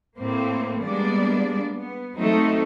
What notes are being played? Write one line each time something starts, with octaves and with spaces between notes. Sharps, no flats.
A2 A#3 C4
G3 G#3 A#3 B3 D4 D5
B3
F#3 A3 C4 D#4